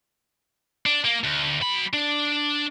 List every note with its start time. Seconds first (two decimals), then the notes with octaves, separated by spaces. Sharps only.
0.86 D4
1.05 A#3
1.24 D2
1.62 F#3 B5
1.94 D4